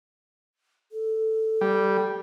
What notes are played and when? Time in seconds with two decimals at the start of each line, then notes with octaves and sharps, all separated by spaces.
0.92 A4
1.61 G3